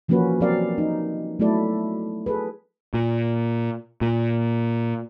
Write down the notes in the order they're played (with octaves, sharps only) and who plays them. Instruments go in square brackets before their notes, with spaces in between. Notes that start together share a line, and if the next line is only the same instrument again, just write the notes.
[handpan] E3 F3 A#3 C#4 F#4 B4
F#3 C4 G4 A#4 D5 F5
D#4
F#3 A3 B3 E4 A4 D5
G#4 A4 B4
[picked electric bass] A#2
A#2